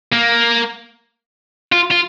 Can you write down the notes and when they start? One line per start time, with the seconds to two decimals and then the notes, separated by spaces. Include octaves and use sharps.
0.12 A#3
1.72 F4
1.91 F4